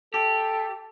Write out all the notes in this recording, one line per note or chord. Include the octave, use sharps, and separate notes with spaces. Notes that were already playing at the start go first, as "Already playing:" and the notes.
G4 A4